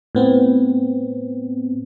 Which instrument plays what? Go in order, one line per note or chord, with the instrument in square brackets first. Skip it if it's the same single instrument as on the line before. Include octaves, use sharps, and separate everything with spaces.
[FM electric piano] A2 B3 C4